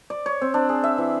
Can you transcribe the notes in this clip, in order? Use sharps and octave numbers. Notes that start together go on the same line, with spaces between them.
D5
C#5
C4
D4
G#4
E5
E3